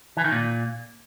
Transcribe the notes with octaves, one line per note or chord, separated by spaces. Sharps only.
E3
D#3
A#2